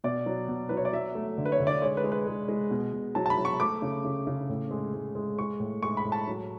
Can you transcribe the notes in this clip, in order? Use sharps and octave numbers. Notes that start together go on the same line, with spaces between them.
B2 D5
F#3
B2
F#3 B4
C#5
D5
F#3 E5
A3
D3
B4
C#5
D3
D5
G#3 C#5
B4
G#3
B4
G#3
G#3
B2
B2
F#3 A5
A5
B5
F#3
C#6
A3 D6
C#3
C#3
C#3
A2
G#3
G#3
G#3
G#3 C#6
A2
G#3 C#6
B5
A2
A5
F#3